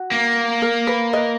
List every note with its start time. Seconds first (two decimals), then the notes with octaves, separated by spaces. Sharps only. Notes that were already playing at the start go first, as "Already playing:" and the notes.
Already playing: F#4
0.11 A#3
0.62 A#4
0.87 B4
1.13 B4 D#5